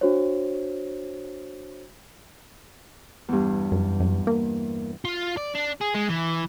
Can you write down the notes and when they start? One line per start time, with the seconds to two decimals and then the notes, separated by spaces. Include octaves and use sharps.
0.01 D4 F#4 C5 C#5
3.28 E2 G2
3.72 F#2
4.00 F#2
4.27 A#3
5.05 F4
5.37 D5
5.55 D4
5.81 G#4
5.94 G#3
6.09 E3